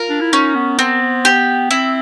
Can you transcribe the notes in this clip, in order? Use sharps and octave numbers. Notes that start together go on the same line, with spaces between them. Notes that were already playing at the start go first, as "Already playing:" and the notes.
Already playing: F4 A#4
D4
E4
C#4 D#4
B3
C4
G4
C4 E4